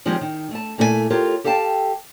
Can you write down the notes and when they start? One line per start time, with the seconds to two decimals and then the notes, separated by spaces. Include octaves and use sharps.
0.05 D#3 F3 G3 G#3 C4 C#4
0.21 D#3
0.51 A3 A5
0.78 A#2 A3 E4 A4 C5 G#5
1.10 F4 G4 A4 A#4 C#5
1.44 G4 A4 F5 G5 A5